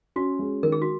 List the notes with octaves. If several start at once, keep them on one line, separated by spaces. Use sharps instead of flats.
C#4 F#4
G#3
D#3 A#4
G#4
F#4